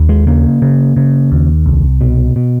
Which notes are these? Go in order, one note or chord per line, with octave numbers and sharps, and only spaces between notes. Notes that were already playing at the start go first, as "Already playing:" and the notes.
Already playing: D#2
G#3
C#3 A#3
C#3
C#3
D#2
C2
B2
B2